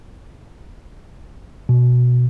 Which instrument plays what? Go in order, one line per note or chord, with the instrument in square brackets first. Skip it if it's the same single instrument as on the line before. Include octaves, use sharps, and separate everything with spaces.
[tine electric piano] B2